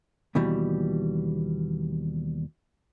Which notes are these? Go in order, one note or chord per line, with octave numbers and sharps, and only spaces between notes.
D#2 B2 E3 G3